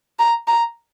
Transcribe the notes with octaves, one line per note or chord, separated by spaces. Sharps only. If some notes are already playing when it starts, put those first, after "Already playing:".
A#5
A#5